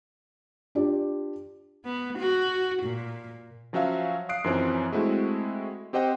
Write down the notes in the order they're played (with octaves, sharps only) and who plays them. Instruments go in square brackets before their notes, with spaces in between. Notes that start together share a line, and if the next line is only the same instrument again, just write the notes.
[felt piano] D4 F4 G4 D5
[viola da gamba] B3
F#4
A#2
[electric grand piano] F3 F#3 C#4 F#4 E5 F5
F5 D#6 F#6 C7 D7
F#2 E3 F3 C4 C#4 D#4
G#3 A3 C4 E4 F#4
C4 G4 C5 D#5 F#5 G5